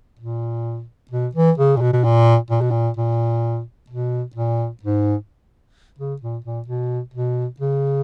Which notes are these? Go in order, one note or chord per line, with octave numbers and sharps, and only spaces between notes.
A#2
B2
E3
C#3
A#2
B2
B2
A#2
A#2
B2
A#2
A#2
B2
A#2
G#2
C#3
A#2
A#2
B2
B2
C#3